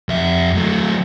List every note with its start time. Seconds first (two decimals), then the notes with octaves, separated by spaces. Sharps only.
0.09 F2 E5
0.55 F#3 A3